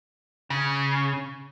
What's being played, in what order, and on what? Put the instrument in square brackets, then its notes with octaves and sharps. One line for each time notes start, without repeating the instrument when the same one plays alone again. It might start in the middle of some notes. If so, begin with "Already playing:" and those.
[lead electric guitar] C#3